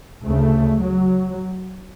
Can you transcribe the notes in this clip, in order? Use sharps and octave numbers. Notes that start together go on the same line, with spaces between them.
D2 C#3 A3
F#3